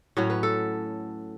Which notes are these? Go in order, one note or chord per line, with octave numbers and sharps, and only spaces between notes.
A2 F#3 C#4 F#4
B4
A4